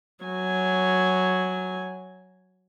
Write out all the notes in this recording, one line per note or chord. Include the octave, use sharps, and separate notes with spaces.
F#3 G#5